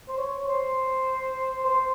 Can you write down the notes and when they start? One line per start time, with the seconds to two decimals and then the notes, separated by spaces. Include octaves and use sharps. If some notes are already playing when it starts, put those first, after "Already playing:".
0.08 C5
0.18 C#5
0.48 C5
1.65 C5